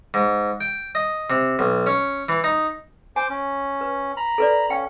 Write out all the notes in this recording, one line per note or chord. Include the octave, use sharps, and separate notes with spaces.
G#2
G5
D#5
C3
B1
C#4
E3
D#4
C5 G#5 D6
C#4
B4
A#5 B5
A4 B4 D5
C#4 F5 G5